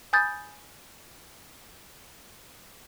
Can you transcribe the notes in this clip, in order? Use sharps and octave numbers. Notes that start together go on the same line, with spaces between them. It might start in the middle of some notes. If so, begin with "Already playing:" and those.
G#5 B5 D#6 G6 A6